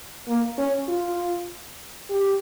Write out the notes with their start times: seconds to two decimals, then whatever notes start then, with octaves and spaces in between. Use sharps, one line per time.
0.28 A#3
0.58 C#4
0.88 F4
2.10 G4